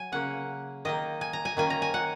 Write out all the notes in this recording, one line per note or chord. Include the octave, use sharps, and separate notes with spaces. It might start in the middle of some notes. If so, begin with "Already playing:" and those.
Already playing: F#3 G#5
C#3 A#3 C#4 F#5
D#3 A#3 D#4 D#5
G#5
A#5
G#5
D#3 A#3 C#4 G#5
A#5
G#5
F#5